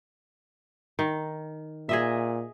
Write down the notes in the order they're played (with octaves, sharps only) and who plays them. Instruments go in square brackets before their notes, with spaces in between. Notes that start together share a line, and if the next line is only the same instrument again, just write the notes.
[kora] D#3
[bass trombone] A#2 [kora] G#4 D#5 E5